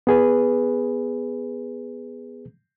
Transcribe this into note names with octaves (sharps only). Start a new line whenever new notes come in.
B3 G#4 B4